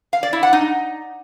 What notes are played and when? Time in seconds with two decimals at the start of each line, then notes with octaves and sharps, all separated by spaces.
0.13 F5
0.23 D5
0.33 E4
0.43 F#5
0.53 D#4